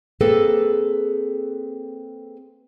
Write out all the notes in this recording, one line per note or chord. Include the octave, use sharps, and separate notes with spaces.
A#3 C4 G#4 A4 B4